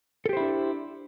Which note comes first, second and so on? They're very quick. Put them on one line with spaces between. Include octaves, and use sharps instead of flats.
A4 G4 C5 E4 D4